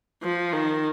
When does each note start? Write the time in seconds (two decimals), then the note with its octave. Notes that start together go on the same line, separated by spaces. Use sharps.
0.23 F3
0.53 D#3